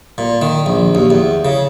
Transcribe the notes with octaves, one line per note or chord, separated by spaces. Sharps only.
A#2
D#3
A#1
D#2
E2
C#3